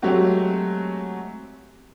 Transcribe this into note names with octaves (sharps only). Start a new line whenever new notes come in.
F#3 G#3 A3 C4 F#4 G4